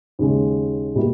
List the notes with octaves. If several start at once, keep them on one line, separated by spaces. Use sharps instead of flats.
D#2 C#3 G#3
B2 G3 A#3 E4